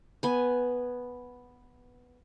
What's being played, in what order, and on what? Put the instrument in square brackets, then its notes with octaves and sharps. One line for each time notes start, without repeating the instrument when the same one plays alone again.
[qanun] B3 G#5